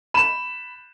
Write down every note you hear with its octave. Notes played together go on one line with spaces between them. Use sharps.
B5 E7